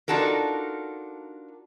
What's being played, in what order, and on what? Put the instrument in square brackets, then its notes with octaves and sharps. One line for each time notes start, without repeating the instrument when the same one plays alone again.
[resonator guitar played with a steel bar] D4 D#4 F4 F#4 A4 A#4